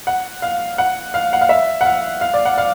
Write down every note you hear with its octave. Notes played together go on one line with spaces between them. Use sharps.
F#5
F5
F#5
F5
F#5
F5
E5
F#5
F5
F5
D5
F#5
F5